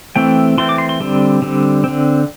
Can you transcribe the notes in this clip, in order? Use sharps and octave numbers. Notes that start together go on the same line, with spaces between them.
E3 A3 C4 G5
E3 A3 C4 C6
D6
C6
C6
D3 G3 C4
D3 G3 C4
D3 C4